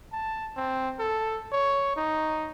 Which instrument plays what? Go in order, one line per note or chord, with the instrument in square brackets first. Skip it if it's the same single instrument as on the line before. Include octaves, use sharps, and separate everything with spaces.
[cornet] A5
C4
A4
C#5
D#4